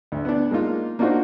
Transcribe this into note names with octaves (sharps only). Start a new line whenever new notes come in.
D2
B3 D4
G#3 A#3 D#4 F4
A#3 D4 D#4 F4 F#4 C5